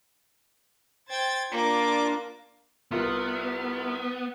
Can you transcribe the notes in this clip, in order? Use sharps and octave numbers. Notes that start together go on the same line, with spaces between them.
C5 G5 G#6 A6
A#3 D4 F4 D6
C2 B3 F4 A#4